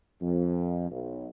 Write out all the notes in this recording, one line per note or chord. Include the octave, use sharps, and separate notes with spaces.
F2
B1